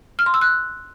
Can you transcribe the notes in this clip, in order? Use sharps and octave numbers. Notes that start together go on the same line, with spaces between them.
F6
C6
E6
F#6